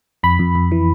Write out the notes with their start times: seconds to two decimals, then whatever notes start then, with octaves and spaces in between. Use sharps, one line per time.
0.23 F2 B5
0.39 F2
0.55 F2
0.72 E3